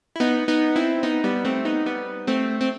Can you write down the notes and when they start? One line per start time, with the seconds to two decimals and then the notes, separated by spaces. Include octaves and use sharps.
0.16 E4
0.20 B3 D#4
0.48 B3 D#4
0.76 C4 E4
1.03 B3 D#4
1.24 G3 B3
1.45 A3 C4
1.65 B3 D#4
1.86 G3 B3
2.27 A3 C4
2.61 C4